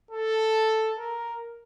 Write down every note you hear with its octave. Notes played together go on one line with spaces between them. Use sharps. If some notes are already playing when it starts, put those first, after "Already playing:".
A4
A#4